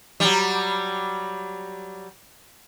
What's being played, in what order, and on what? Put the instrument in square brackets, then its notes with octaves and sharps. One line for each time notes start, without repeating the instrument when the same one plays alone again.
[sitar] F#3 G3